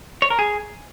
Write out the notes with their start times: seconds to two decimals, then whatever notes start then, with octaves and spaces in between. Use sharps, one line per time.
0.22 C#5
0.30 A#4
0.39 G#4